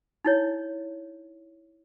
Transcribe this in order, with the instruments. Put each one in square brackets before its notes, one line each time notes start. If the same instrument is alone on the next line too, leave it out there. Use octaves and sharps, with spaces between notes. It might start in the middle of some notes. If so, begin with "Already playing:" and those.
[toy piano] D#4 E4 C#5